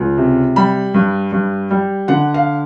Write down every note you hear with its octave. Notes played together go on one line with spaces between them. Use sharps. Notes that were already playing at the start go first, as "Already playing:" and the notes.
Already playing: C#2
C3
G3 B5
G2
G2
G3
D3 F#5
F5